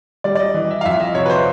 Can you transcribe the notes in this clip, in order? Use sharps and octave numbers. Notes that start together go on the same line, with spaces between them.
G3 D5
D5
D#5
E3
E5
F5
F2 E5
D#5
C3 C#5
B4
C5